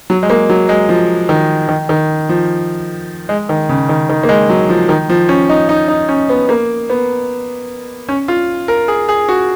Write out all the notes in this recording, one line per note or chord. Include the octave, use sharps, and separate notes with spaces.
F#3
G#3
A#3
F#3
G#3
F3
D#3
D#3
D#3
F3
G#3
D#3
C#3
D#3
D#3
A#3
G#3
F#3
F3
D#3
F3
C#4
D#4
D#4
D#4
C#4
B3
A#3
B3
C#4
F4
A#4
G#4
G#4
F#4